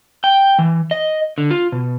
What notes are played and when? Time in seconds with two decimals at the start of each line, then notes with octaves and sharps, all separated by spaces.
0.24 G5
0.59 E3
0.91 D#5
1.38 D3
1.51 F4
1.72 B2